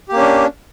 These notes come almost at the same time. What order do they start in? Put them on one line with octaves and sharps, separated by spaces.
G4 A#3 C#4 D4